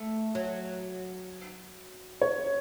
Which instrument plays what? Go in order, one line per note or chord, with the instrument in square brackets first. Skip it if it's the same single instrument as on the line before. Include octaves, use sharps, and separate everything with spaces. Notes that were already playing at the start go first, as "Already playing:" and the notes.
Already playing: [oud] A3
F#3
[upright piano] C#5